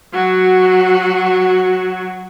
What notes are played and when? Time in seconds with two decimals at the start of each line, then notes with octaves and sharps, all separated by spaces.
0.14 F#3 F#4